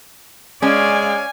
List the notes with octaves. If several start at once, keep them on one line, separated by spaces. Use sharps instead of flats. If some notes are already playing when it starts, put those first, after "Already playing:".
G#3 C#4 D5 F5 G#5